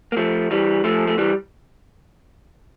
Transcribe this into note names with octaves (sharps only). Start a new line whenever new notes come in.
A#3
F3 A3
E3 G3
F3 A3
A3
E3 G3